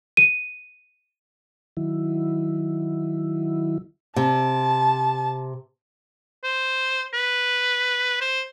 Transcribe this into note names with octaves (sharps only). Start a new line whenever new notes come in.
D#7
D#3 F#3 E4
C3 A5
C5
B4
C5